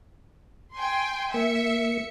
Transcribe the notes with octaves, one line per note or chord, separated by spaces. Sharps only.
G5 G#5 C6
A#3 E5 C#7